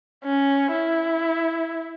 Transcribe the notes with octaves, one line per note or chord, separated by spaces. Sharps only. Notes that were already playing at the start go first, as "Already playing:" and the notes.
C#4
E4